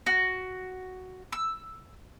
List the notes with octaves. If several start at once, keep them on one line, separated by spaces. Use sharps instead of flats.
F#4
E6